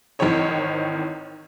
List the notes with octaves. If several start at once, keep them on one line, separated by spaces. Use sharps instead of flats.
G#1 D#3 E3 C4 C#5 D#5